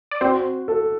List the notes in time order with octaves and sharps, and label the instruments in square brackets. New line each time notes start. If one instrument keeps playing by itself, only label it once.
[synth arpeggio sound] D5
[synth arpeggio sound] C4 C5 [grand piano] F#4
[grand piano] A4